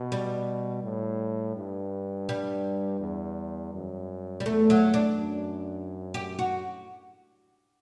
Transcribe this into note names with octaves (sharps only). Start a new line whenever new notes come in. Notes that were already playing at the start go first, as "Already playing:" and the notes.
Already playing: B2
G3
A2
G2
G3
E2
F#2
G3
E2 A3
F#3
D4
F#2
G4
F#4